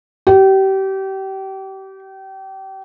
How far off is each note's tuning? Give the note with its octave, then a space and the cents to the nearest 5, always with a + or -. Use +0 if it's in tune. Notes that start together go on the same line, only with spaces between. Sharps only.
G4 -30